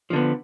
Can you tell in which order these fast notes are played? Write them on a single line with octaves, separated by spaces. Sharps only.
F3 D3 B3